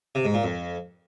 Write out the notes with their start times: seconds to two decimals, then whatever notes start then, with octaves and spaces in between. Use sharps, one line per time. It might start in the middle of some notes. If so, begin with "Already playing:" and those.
0.15 C3
0.25 G#2
0.34 A#2
0.43 F2